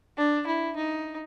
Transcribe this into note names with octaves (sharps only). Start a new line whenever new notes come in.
D4
E4
D#4